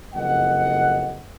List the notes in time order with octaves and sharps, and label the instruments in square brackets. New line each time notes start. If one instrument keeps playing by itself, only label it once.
[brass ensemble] F#1 F2 D#5 F#5